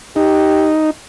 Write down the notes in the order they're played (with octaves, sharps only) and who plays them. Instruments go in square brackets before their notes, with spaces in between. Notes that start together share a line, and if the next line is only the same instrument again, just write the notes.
[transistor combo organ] D#4 [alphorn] G4